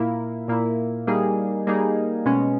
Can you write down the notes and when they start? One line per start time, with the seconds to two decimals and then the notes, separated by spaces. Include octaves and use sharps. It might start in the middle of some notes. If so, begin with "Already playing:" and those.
Already playing: A#2 A#3 E4
0.48 A#2 A#3 E4
1.07 G3 A#3 D#4 G#4
1.67 G3 A#3 D#4 G#4
2.26 B2 G#3 C#4